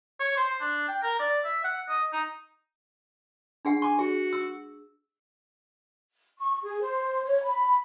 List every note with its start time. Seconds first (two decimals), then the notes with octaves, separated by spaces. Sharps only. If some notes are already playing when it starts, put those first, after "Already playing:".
0.20 C#5
0.37 C5
0.60 D4
0.88 G5
1.02 A#4
1.19 D5
1.44 E5
1.64 F#5
1.89 D#5
2.12 D#4
3.65 D4 G#4 F#5
3.82 G#5 C#6 D6
3.99 F#4 G#4
4.33 E6
6.39 C#6
6.62 G#4
6.81 C5
7.24 C#5
7.44 B5